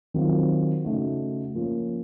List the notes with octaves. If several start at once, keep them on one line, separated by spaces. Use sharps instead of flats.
D#3 F#3 C4 F4
C#3 A3 D#4 F#4
F3 A#3 C#4